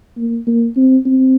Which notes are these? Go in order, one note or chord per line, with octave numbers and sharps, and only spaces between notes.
A#3
A#3
C4
C4